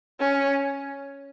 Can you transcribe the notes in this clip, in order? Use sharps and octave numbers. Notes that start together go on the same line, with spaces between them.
C#4